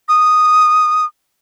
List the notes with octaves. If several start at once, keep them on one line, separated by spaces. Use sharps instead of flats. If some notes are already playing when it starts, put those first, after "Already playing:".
D#6